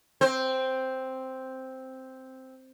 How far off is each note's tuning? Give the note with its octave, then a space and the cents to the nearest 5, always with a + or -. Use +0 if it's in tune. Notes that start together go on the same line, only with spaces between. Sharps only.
C4 +0 C5 +0